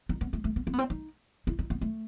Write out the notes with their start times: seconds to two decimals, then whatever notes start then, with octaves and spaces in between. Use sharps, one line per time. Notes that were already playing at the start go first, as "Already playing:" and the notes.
0.09 D#4
0.21 B3
0.33 A3
0.44 A3
0.56 B3
0.67 C4
0.73 B3
0.78 C4
0.90 D#4
1.47 E4
1.59 D#4
1.70 B3
1.81 A3